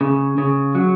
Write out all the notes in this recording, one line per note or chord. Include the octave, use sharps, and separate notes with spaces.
C#3
C#3
F#3